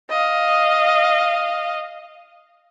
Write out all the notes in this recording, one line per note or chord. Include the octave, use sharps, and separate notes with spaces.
D#5 F5